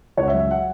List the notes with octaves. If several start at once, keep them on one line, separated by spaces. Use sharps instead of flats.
C#2 C#5
F#5
E5
F#3
E5
F#5